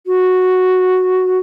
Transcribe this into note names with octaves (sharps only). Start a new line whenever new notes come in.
F#4